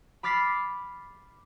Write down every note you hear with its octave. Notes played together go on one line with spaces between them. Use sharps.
B5 D6 F6 A6 B6 C7